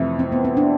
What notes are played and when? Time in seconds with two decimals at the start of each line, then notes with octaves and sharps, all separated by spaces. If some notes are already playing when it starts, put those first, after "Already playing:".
Already playing: F2 C3 E3 A3 E4
0.19 C4
0.32 B3
0.45 C4
0.57 D4